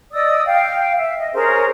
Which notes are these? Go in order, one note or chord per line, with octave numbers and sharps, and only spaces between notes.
D5 D#5 D#6 E6
F5 G5
E5
D#5
C#4 G#4 A#4 C5